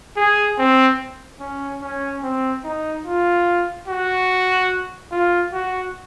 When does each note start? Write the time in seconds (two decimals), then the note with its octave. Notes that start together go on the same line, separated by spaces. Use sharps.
0.17 G#4
0.58 C4
1.40 C#4
1.81 C#4
2.23 C4
2.64 D#4
3.05 F4
3.88 F#4
5.12 F4
5.53 F#4